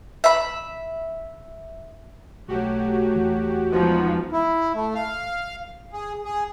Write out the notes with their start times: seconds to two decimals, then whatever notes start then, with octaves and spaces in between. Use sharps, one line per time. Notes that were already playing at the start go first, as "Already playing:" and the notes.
0.24 E5 B5
2.48 B1 F#3 A3 F#4 G4
3.15 E2 E3
3.72 F3 G#3 B3 D#4 F#4
4.32 E4
4.74 A3
4.95 F5
5.93 G#4
6.25 G#4